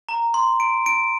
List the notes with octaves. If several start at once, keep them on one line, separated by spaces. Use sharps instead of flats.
A#5
C6
D7
D7